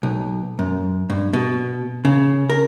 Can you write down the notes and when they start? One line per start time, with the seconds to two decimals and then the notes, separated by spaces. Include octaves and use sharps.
0.03 B1
0.59 F#2
1.10 G2
1.33 B2
2.05 C#3
2.50 A#4